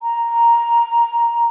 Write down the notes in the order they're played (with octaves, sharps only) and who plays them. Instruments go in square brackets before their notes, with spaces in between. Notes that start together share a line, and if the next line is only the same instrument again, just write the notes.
[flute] A#5